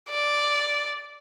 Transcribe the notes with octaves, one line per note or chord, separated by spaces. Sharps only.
D5